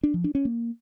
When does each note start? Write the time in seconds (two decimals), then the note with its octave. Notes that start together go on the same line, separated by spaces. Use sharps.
0.03 D4
0.14 F3
0.24 D4
0.35 C#4
0.45 A#3